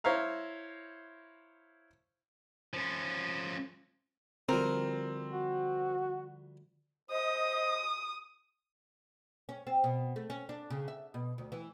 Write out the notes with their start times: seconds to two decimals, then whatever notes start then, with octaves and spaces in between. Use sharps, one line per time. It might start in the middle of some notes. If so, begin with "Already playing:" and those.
0.04 E4 C5 C#5 E5 F5 A#5
2.74 F3 C#4
4.49 D2 F3 G3 C4 A#4
5.30 F#4
7.11 C5 D#5 D#6
9.49 C#4
9.67 C4
9.84 B2
10.16 A3
10.30 C#4
10.49 D4
10.70 C#3
10.88 E5
11.14 B2
11.38 D2
11.52 E3